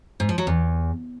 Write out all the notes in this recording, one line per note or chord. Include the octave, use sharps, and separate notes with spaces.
G#2
F3
F#3
E2